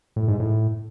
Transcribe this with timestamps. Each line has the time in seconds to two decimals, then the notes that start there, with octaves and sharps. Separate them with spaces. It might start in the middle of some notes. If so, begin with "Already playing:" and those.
0.16 A2
0.28 G#2
0.40 A2